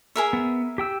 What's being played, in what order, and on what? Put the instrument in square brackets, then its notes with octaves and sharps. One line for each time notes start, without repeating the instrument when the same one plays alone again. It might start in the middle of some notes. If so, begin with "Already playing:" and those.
[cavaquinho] G#4 A#4 E5
[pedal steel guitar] B3
G4 G5 E6